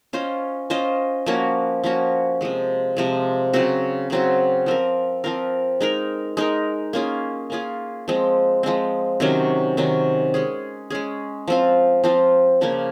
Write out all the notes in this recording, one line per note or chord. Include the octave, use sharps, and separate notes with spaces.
C#4 F4 C5 D#5
C#4 F4 C5 D#5
F3 A#3 C#4 F#4
F3 A#3 C#4 F#4
C3 F3 G#3
C3 F3 G#3
C#3 F#3 C4 F#4
C#3 F#3 C4 F#4
F3 C4 F4 A#4
F3 C4 F4 A#4
G#3 D#4 A#4
G#3 D#4 A#4
A#3 C#4 F4 G#4
A#3 C#4 F4 G#4
F3 G#3 C4
F3 G#3 C4
C3 D#3 F#3 C#4
C3 D#3 F#3 C#4
G#3 C#4 G#4
G#3 C#4 G#4
F3 C4 F4
F3 C4 F4
C#3 F3 A#3